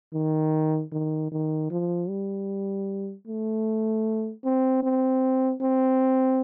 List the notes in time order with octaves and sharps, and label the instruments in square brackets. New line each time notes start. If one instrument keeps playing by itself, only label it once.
[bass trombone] D#3
D#3
D#3
F3
G3
A3
C4
C4
C4